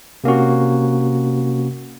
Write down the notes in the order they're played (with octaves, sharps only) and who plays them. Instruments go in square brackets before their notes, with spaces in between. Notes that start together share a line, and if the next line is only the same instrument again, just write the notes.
[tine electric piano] C3 A#3 C#4 F#4